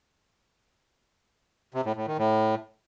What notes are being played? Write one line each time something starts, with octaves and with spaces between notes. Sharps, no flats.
C3
A2
A2
D#3
A2